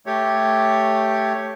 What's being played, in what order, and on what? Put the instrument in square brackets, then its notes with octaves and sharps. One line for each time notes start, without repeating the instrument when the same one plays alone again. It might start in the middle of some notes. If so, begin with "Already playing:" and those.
[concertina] A3 G4 C#5